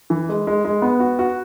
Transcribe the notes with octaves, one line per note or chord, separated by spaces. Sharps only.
E3
G#3
G#3
G#3
B3
F#4
F#4